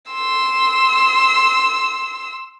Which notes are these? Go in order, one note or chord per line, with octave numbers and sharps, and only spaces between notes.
C6 E6